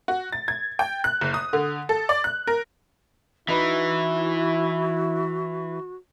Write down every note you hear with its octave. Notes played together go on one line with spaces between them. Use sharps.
F#4
A6
G#6
G5
F#6
F#1
D#6
D3
A4
D5
F#6
A#4
E3 D#4 E4 F#4 B4 B5